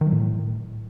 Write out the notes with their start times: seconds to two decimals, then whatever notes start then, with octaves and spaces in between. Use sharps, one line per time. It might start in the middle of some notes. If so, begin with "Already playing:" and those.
0.01 D#3
0.07 F#3
0.12 A2